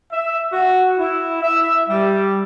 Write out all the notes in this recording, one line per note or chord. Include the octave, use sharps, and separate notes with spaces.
E5
F#4
E4
E5
G3